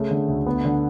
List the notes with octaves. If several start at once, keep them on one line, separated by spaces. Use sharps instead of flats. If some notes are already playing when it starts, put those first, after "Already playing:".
Already playing: C#3 A3
D3
D2
B3
D3